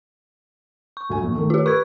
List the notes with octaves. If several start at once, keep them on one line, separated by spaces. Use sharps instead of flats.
C#6
D2 G#5
A#1 E2
D#3 A3
F4 G4
B4 C#6 G#6